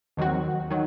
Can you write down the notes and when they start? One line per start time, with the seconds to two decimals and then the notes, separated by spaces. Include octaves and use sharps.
0.17 D#2 D#3 F#3 C4 F#4
0.70 D#3 F#3